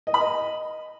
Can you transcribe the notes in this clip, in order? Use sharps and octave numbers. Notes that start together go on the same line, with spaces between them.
D#5
B5
D#5